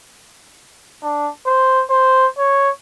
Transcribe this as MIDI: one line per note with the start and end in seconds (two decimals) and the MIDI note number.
1.02 1.29 62
1.46 1.83 72
1.90 2.27 72
2.38 2.70 73